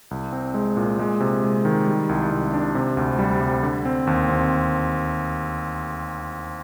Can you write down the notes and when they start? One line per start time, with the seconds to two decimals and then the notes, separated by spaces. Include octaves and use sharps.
0.11 C2
0.32 C4
0.54 G#3
0.77 A#2
0.99 G#3
1.20 C3
1.43 G#3
1.65 D#3
1.87 G3
2.09 C2
2.31 C2
2.53 D4
2.75 C3
2.97 D2
3.19 G3
3.41 C3
3.63 D3
3.85 C4
4.07 D#2
4.29 C4